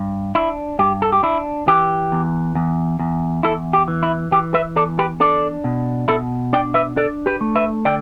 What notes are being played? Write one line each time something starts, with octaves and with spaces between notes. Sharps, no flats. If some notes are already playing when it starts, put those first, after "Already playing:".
Already playing: G2
D4 E4
G2 G4
A4
G4
D4 E4
E3 G4
E2
E2
E2
E2 E4 A4
G4
E3
E4
E3 G4
B4 E5
E2 A4 D5
G4 B4
D4 A4 D5
B2
B2 E4 A4
D4 D5 G5
B4 E5
D4 A4 D5
G4 B4
A3
B4 E5
D3 D5 G5